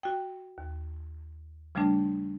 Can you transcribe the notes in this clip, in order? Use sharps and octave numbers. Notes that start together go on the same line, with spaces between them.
F#4 G5
D#2
C#3 F3 G3 A3 D4